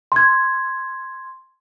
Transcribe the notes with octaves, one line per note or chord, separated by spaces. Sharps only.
C6 G#6